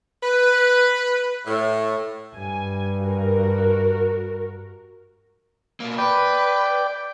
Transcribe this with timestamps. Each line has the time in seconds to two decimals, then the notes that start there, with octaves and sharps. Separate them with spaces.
0.23 B4
1.47 A2
2.36 G2 G#5
3.00 F#4 A#4
5.80 B2 A#3
5.98 B4 D5 G5